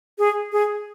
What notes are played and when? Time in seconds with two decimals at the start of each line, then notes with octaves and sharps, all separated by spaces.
0.18 G#4
0.52 G#4